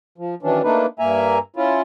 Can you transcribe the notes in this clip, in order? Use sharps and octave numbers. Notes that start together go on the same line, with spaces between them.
F3
D#3 E3 F#3 C#4 D4
A3 A#3 D4 D#4 B4
G2 A#3 E5 G#5 A#5
C#4 E4 F4